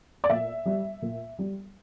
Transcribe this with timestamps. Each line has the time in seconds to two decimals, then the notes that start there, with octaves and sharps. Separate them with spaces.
0.24 D5
0.30 A#2 E5
0.66 G3
1.02 A#2
1.39 G3